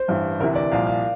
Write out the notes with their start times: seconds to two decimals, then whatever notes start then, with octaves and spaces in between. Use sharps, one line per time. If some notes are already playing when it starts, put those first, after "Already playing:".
Already playing: C5
0.08 A1 G2 E3
0.40 D2 C3 E3 A#4
0.55 D5
0.72 C2 A#2 F3 F5
0.87 F5